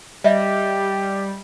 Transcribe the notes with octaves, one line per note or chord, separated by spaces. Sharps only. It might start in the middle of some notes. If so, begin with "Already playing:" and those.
G3 G4 D#5 E5